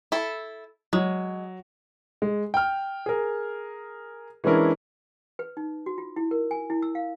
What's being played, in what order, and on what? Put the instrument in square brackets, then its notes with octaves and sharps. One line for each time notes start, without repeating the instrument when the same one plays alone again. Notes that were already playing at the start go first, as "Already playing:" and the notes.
[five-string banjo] E4 A4
[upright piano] F#3 [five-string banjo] G#3
[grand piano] G#3
G5 F6
G#4 A#4
E3 G#3 C#4 D4 E4 A#4
[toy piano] B4
D#4
F#4
F4
E4
A#4
G#5
E4
E6
F5